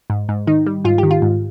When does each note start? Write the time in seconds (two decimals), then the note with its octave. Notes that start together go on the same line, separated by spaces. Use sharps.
0.10 G#2
0.29 G#2
0.47 D#3 D#4
0.67 G3
0.85 G#2 F4
0.98 D#3 G4
1.11 F4
1.22 G#2